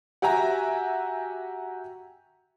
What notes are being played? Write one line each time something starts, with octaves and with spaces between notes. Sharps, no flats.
F#4 G4 E5 G#5 A#5